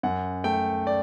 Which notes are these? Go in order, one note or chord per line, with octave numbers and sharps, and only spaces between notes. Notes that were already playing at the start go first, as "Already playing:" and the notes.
F#2 F#5
A3 G5
D5